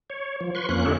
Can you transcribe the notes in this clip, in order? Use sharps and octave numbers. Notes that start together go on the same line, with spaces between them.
C#5
F3
B4 C6 C#6
F2 A#3 C#4 F#6
D3 A3 D#4 G4 A4 C#5